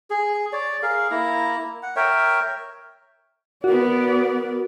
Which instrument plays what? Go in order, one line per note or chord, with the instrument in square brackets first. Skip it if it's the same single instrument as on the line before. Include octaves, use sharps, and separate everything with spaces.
[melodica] G#4
C#5 D5
G#4 A#4 F5
A#3 E4 A#5
F#5
A#4 C#5 E5 G5
[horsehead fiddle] B3 D5 [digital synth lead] F#4 [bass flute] A#4